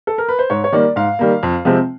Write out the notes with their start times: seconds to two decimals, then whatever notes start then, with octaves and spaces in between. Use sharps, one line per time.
0.07 A4
0.18 A#4
0.29 B4
0.39 C5
0.50 G#2 C#5
0.64 C#5
0.72 D#3 G3 A#3 D5
0.96 G#2 F5
1.19 D#3 G3 A#3
1.43 F2
1.65 C3 F3 G#3 C4